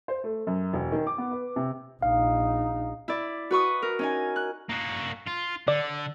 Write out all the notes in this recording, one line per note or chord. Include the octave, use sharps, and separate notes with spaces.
C5
A3
F#2
E1
D#3
D6
B3
B4
C3
A#1 D#4 F5
E4 D5
F#4 B4 C#6 D#6
A#4
C#4 D#4 G#5
F#6
A#3 F#4
F4
D3 D5